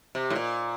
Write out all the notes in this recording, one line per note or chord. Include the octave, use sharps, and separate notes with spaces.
C3
A2
A#2